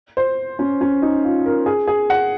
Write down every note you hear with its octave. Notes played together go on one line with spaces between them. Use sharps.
C5
C#4
C#4
D#4
F4
A#4
G#4
G#4
F#5